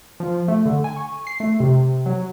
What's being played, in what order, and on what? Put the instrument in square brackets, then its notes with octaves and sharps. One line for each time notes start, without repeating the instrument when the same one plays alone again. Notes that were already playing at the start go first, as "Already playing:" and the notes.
[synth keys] F3
A3
D3
G#5
C#6
C7
A3
C3
F#3